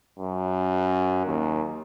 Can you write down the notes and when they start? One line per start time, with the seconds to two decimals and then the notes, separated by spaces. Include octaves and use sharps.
0.19 F#2
1.26 D#2